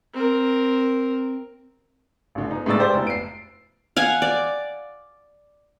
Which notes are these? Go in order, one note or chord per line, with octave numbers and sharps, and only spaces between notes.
C4 A#4
A1 D3
B3 D#4
A2 D3 G#3 D4 E6 A6
G4 C5 D5
F1 B3 E4
C7 D7
F5 F#5 G#5
D5